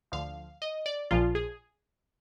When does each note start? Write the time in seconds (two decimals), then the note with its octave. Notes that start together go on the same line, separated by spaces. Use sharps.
0.12 D2 D3 F3 F5
0.62 D#5
0.86 D5
1.11 A#1 A#2 F3 F4
1.35 G#4